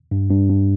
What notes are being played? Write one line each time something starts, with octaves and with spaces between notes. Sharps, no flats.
G2
G2
G2